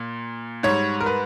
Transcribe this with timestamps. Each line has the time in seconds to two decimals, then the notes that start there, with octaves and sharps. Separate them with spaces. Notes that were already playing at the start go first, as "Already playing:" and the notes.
Already playing: A#2
0.63 G#2 G3 C#5
1.01 A#4
1.06 B4